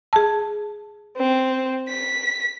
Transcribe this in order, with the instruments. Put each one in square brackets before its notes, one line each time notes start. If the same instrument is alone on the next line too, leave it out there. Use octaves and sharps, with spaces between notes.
[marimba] G#4 A5
[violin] C4
B6